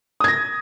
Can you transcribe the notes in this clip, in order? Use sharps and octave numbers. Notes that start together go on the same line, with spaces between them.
D#6 G#6 A#6